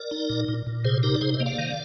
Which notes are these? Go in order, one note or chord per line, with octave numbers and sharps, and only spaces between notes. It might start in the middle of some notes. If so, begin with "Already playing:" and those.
Already playing: A#4 D5
D#4
A#2
A#2
A#2
C3 G#4 C5
D#4 G4 A#4
D5
C3 G#4 C5
C5 D#5
A#3
D5 F5
D#3